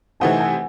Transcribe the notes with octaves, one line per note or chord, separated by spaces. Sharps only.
C3 E3 A3 C4 D#4 F#5 G#5
F#5 G#5